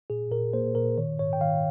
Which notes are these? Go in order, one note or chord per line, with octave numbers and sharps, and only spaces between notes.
A#2 G#4
A#2 A#4
A#3 C5
A#2 A#4
D#3 C#5
G#2 C#5
G5
D#3 F5